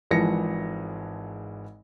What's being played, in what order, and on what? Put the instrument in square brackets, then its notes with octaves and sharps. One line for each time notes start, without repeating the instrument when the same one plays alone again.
[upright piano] G#1 G#2 E3 F3 A#6 C#7